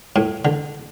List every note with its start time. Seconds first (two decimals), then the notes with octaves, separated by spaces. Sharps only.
0.16 A2
0.45 D3